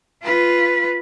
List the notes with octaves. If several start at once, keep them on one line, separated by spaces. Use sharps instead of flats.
F4 B4